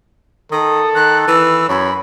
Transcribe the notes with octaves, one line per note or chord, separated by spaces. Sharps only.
D#3 A4 D#6
D#3 F#6
E3 E6
F#2 C#5 B5